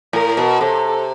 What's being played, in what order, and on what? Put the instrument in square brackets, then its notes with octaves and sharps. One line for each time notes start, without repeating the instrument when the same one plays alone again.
[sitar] A2 [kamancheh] A#4
[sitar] B2
[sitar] C3 [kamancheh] A4